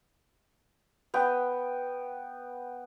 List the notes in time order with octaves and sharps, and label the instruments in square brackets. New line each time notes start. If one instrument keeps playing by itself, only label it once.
[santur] B3 G5